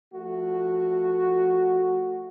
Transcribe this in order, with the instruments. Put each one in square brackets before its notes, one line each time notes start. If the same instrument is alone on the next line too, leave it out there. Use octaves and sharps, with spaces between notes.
[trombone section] F3 A3 F#4